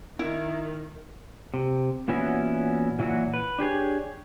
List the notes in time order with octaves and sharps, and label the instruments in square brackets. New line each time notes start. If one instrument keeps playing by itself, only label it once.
[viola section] D#3 [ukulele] E4
[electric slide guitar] C3
A#2 E3 B3 C#4 E4 F#4
A#2 E3 F#3 F#4
B4
D4 G4 G#4 C#5